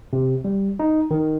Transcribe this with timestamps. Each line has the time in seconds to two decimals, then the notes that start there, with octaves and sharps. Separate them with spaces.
0.13 C3
0.45 G3
0.79 D#4
1.11 D#3